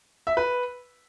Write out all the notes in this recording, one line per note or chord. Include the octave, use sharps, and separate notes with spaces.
E5
B4